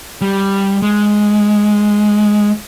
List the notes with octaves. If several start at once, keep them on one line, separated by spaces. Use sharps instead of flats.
G3
G#3